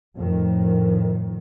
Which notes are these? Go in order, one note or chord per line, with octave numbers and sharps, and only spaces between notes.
F2 A2 D#3